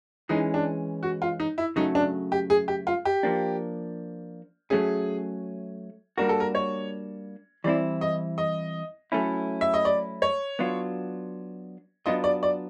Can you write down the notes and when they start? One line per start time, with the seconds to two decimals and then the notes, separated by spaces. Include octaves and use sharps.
0.29 E3 G#3 C#4 D#4
0.54 D4
1.03 F#4
1.22 F4
1.40 D#4
1.58 E4
1.76 C#3 F#3 A3 D#4
1.95 D4
2.32 G4
2.50 G#4
2.68 G4
2.87 F4
3.05 G4
3.23 F3 A#3 D4
4.70 F#3 A3 C#4 G#4
6.18 G3 A#3 D4 F#4 A#4
6.29 A4
6.40 A#4
6.55 C#5
7.64 E3 G3 C4 E4 D5
8.01 D#5
8.38 D#5
9.12 F#3 A3 C#4 E4
9.61 E5
9.74 D#5
9.85 D5
10.22 C#5
10.59 F#3 B3 D4 F4
12.06 F#3 B3 D4 F4 D#5
12.24 D5
12.43 D5